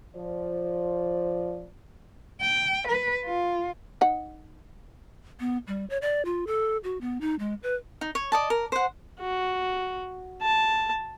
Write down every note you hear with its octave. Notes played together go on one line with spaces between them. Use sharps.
F3 C5 D5
G5
B4
F4
D#4 F#5
B3
G3
C#5
D5
F4
A4
F#4
B3
D#4
G#3
B4
D#4
C#5
D5 D#5 A5
A#4
C5 F#5
F#4
A5